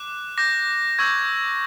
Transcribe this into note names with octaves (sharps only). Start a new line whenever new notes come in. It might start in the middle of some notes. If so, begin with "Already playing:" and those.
Already playing: D6 F#6
D6 G6 A#6
C#6 E6 G6 G#6